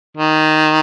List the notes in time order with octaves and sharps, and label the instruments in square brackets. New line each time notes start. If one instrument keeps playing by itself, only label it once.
[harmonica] D#3